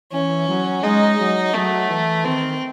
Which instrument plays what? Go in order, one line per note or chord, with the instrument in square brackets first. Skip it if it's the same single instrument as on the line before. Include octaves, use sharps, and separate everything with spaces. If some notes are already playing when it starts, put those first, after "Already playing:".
[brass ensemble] E3 [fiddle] C#4
[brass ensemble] F#3
[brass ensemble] G#3 [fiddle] D#4
[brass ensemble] F#3
[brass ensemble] F#3 [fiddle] A3
[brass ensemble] E3
[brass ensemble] D#3 [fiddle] C4